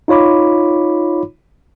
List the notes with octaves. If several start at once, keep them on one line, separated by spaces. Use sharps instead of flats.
D#4 F4 C#5 B5 D6